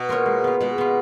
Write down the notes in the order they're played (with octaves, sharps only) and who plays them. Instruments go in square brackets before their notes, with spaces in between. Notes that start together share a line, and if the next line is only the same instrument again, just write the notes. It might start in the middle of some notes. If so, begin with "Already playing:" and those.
Already playing: [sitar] B2 [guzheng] D#4
[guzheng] A#3 F4 A#4 C#5
G#3
B3 F4
[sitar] B2 [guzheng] G#3
[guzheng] B3 F4